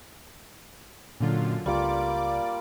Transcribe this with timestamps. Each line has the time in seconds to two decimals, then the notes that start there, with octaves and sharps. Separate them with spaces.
1.20 F#2 A#2 D3 F4
1.66 C#2 G3 A#3 F4 D5 D6